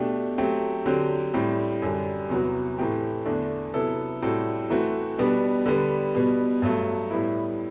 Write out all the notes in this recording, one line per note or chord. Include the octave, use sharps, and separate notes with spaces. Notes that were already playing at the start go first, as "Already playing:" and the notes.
Already playing: B2 A3 D4 G4
F#3 A3 C4 G4
D3 F#3 C4 G4
A2 G3 C4
F#2 D3 G3
E2 C3 F#3 B3 F#4
A2 E3 A3 C4 G4
E2 D3 A3 D4
C3 F#3 B3 E4 A4
A2 G3 C4 F#4 A4
E3 A3 C4 F#4
B2 G3 B3 D4
D3 G3 B3
B2 G3 B3
G2 F#3 A3
A2 G3 B3 E4